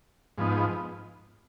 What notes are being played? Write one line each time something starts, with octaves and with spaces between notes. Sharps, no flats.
G#2 F3 B3 D#4